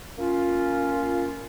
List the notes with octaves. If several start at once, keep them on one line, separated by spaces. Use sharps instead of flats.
A#3 C#4 F4